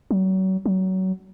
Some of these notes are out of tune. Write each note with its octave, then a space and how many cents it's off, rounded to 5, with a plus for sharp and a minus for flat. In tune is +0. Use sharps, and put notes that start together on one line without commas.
F#3 +35
F#3 +25